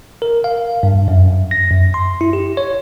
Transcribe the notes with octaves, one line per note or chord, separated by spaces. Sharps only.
A#4
F5
G2
F#2
A#6
F#2
C6
E4
G4
C#5